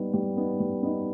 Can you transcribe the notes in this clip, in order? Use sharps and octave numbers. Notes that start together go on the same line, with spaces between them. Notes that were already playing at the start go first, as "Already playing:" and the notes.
Already playing: G3 B3 D#4
G3
B3 D#4
G3
B3 D#4